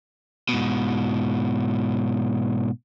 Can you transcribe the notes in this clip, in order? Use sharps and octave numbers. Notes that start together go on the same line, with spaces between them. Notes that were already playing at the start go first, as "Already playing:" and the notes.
G#2 B2